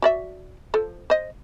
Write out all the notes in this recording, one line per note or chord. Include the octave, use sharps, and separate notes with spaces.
F#4 D5 E5
F3 A4
C5 D#5